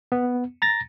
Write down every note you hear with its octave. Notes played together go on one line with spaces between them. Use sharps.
B3
A#5 A6 A#6